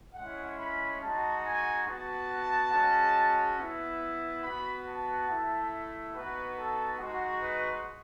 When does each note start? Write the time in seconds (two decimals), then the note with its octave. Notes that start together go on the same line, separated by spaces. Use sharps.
0.14 G#3 C#4 E4 F#5
0.57 B5
1.01 G#3 D#4 F#4 A5
1.43 G#5
1.86 B3 F#4 A5
2.72 G#3 C#4 F#4
3.57 B3 E4
4.43 B3 F#4 B5
4.86 A5
5.29 A3 E4
6.13 B3 D#4 F#4 B4
6.57 A4
6.99 G#3 D#4 F#4
7.42 B4